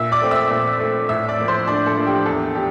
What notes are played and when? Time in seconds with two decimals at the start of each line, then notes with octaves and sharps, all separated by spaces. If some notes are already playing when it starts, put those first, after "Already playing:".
Already playing: A#2 E5 E6
0.12 D5 D6
0.22 A3 C4
0.31 E5 E6
0.51 A#2
0.80 A3 C4
1.09 A2 E5 E6
1.29 D5 D6
1.39 F3 A#3 E4
1.48 C5 C6
1.67 A2 D4 D5
1.87 A4
1.97 F3 A#3 E4
2.07 G4
2.26 E2 A4
2.55 D4 G4